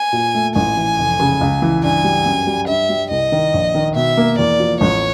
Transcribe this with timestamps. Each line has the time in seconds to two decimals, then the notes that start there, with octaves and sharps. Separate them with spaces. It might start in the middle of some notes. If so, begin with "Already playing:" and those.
Already playing: G#5
0.13 A#2
0.34 A3
0.56 A1 G#5
0.77 E3
0.99 F1
1.20 C#3
1.41 C#2
1.62 E3
1.83 G2 G#5
2.04 G3
2.26 F#2
2.47 G3
2.68 G2 E5
2.89 G3
3.10 C2 D#5
3.32 D#3
3.54 A#1
3.74 D#3
3.95 B2 E5
4.17 A#3
4.38 E2 D5
4.60 F3
4.81 A1 C#5